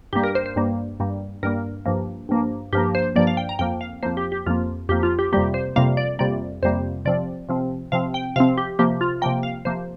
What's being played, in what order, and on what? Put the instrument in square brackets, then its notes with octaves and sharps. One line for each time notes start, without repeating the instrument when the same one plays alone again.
[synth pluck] G2 G3 A#3 G4
A#4
C5
C5
G2 G3 A#3
G2 G3 A#3
G2 G3 A#3 A#4
G2 F3 A#3
G2 F3 A#3
G2 F3 A#3 G4
C5
G2 F3 A#3 D5
F5
G5
A#5
F2 F3 A#3 G5
F5
F2 F3 A#3 C5
G4
G4
F2 F3 A#3 F4
F2 F3 A#3 G4
F4
G4
F2 C3 G3 A#3 G4
C5
F2 C3 G3 A#3 F5
D5
F2 C3 G3 A#3 D5
F2 C3 G3 A#3 C5
C3 F3 C4 D5
C3 F3 C4
C3 F3 C4 F5
G5
C3 F3 C4 F5
G4
C3 F3 A#3 G4
F4
C3 F3 A#3 G5
F5
C3 F3 A#3 C5